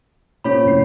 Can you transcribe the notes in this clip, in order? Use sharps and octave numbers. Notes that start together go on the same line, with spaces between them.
A#2 A#3 C#4 C5 C#5 B5
F1 A2 C7